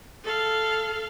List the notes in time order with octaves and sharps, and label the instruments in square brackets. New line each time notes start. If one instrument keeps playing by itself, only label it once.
[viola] A4 F5